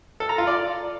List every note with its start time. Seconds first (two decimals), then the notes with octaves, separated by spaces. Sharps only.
0.20 A4
0.29 A#5
0.38 F4
0.47 D5